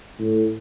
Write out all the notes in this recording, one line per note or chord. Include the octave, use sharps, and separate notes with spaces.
A2